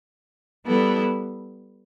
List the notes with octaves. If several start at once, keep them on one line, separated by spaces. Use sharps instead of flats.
G3 B3 E4 A4